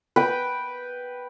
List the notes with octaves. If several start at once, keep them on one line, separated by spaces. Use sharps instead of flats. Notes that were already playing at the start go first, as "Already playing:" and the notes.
B4 G5